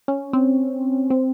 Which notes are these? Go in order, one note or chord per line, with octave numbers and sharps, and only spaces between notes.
C#4
C4
C4